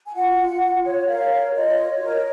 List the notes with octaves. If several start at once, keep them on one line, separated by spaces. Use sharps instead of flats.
G#5
F4 F#5
F4
F4
C#5
A#4 F5
C#5
F4 D#5
C#5
A#4 D#5